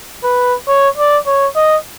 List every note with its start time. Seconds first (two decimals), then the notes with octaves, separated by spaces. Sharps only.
0.24 B4
0.68 C#5
0.97 D5
1.26 C#5
1.56 D#5